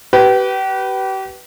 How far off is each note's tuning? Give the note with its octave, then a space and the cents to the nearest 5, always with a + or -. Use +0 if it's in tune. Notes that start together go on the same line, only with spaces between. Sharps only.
G4 -35 B4 -5